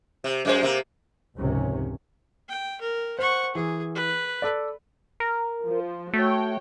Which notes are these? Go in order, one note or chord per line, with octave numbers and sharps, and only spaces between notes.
C3
F#2 G#3 C5
C3 A#3
F1 C#2 G#2 C3 D#3 C#4
G5
A#4
C5 F#5 C#6
E3 G#4
B4
A4 D5
A#4
F3
A3 F#4 C#5 G5